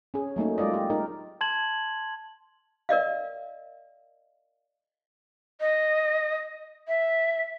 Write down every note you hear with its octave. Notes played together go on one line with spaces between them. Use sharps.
C#4 G#4
F#3 A3 A#3 D#4
G#3 F4 D5 D#5
G4
D#4 A#4
A5 C6 G#6 F#7
A#4 D5 D#5 F5
D#5
E5